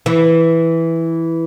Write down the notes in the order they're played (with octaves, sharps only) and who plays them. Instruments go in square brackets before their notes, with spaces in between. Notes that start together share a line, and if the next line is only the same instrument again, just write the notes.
[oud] E3